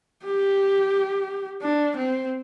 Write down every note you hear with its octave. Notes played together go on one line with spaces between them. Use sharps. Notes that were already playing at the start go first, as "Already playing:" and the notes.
G4
D4
C4